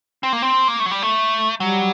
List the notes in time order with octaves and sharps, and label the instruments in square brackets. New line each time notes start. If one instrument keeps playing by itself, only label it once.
[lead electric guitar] C4
A#3
C4
A#3
A3
F#3
G3
A3
[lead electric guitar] F#3 [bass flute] G3